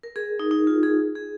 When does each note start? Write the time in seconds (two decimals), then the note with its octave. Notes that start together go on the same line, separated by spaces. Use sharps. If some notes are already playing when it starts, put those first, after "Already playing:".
0.03 A#4
0.16 G#4
0.40 D#4
0.51 D#4
0.67 F4
0.83 G#4
1.15 G#4